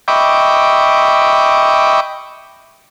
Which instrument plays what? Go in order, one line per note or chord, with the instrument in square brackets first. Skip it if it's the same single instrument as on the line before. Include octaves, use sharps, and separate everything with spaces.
[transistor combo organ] D#5 E5 G5 B5 C#6 D6